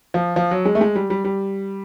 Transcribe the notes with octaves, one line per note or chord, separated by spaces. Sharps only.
F3
F3
F#3
G#3
A3
G#3
G3
G3
G3